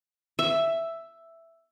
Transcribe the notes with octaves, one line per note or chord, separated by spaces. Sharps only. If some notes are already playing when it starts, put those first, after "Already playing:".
E5